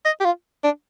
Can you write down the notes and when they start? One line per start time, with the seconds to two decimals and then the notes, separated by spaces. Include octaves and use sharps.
0.05 D#5
0.20 G4
0.25 F4
0.64 D4